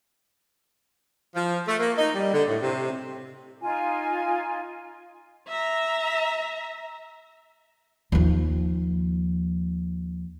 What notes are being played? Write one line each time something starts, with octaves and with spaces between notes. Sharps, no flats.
F3
A3
A#3
D#4
G3
D3
A2
C3
D#4 F4 G#5
E5 A#5
D#2 F3